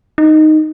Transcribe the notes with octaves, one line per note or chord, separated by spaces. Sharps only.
D#4